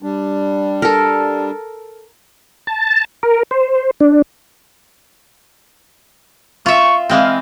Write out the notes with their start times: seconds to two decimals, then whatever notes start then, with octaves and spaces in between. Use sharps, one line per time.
0.03 G3 D4
0.82 A4 A#4
2.67 A5
3.23 A#4
3.51 C5
4.00 D4
6.66 F4 E5 C#6
7.09 E3 G#3 C4 F5